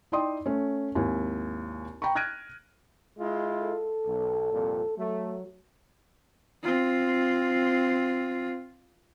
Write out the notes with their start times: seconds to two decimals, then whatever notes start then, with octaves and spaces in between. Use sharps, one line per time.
0.12 D#4 E4 D5 G5 C6 D#6
0.46 A3 C#4
0.95 G#1 D#2 E4 G#5
2.02 G5 A#5 B5 C#6
2.15 F6 F#6 G#6 A#6 D7 D#7
3.19 G#3 E4 F4
3.62 A4
4.06 B1
4.52 C2 F2 A#2
4.98 F#3 A3
6.63 C4 F4